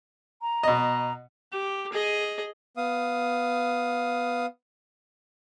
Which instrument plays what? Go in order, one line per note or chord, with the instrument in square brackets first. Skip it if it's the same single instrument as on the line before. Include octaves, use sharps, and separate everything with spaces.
[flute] A#5
[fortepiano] B2 D#5
[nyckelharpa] G4
G#4 D#5
[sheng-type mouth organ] B3 F5 D#6